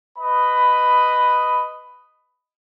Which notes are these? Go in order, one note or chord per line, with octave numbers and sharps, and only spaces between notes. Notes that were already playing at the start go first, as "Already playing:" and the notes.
B4 D#5 B5